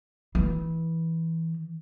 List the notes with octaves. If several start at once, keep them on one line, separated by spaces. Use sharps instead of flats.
E3